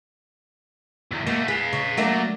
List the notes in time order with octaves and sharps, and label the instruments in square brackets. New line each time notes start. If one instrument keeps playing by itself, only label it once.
[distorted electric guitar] B1 E2
[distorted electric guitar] B2 A3 [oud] A#3
[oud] G#4 [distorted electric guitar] B4 F5
[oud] C#3
[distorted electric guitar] F#3 [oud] A3 A#3 D4